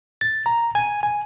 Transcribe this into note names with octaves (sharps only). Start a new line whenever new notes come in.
A6
A#5
G#5
G#5